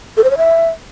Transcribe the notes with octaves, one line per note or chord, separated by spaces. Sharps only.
A4
C5
C#5
E5